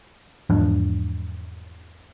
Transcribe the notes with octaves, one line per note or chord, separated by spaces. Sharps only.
E2 G#2 F3 D4